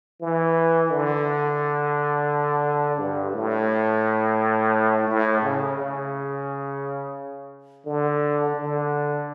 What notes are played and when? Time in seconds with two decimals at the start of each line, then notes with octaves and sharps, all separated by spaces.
0.21 E3
0.90 D3
2.99 G2
3.34 A2
5.08 A2
5.43 C#3
5.77 C#3
7.86 D3
8.56 D3